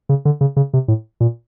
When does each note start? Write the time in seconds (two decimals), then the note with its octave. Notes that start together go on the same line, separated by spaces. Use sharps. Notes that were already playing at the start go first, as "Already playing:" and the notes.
0.09 C#3
0.25 D3
0.41 C#3
0.56 C#3
0.73 C3
0.88 A2
1.20 A#2